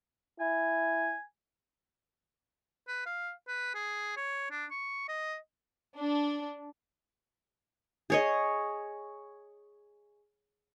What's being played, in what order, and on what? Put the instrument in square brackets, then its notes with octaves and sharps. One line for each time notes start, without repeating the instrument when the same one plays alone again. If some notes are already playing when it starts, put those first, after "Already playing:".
[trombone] E4 [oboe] G#5
[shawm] B4
F5
B4
G#4
C#5
D4
C#6
D#5
[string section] D4
[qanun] G#4 C#5 D#5